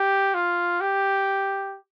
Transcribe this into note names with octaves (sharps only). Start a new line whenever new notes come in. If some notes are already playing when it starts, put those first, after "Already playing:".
Already playing: G4
F4
G4